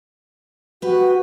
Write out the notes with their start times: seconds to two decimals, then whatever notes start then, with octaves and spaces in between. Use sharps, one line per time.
0.82 F#4 G4 B4